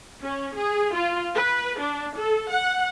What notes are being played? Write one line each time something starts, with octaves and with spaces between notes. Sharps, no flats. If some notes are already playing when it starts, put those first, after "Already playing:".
C#4
G#4
F4
B4
D4
A4
F#5